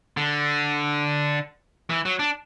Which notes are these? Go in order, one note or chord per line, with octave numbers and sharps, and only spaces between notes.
D3
E3
F#3
D4